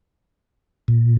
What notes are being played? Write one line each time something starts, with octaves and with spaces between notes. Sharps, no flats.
A#2